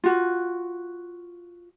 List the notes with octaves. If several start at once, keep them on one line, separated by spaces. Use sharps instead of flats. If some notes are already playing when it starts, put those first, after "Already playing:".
F4 F#4